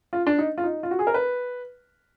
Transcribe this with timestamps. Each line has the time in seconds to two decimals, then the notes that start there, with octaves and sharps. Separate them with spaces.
0.13 F4
0.27 D4
0.39 D#4
0.58 F4
0.64 D#4
0.83 F4
0.91 F#4
0.99 G#4
1.07 A#4
1.14 B4